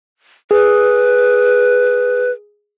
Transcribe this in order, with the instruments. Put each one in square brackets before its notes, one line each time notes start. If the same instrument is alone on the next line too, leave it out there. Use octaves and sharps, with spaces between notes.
[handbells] G#4 [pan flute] B4